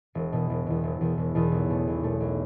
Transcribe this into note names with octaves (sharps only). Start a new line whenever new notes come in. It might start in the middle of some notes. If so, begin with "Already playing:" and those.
E1
E2 B2
E1
E2 B2
E1
E2 B2
E1
E2 B2
B1
B2 A3
B1
B2 A3
B1